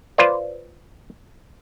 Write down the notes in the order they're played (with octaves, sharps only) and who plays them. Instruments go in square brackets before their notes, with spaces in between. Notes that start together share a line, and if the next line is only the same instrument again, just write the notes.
[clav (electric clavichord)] F4 B4 C5 D5